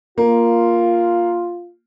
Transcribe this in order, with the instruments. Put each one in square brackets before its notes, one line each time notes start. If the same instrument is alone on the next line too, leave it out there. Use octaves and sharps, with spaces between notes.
[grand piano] A#3 [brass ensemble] F4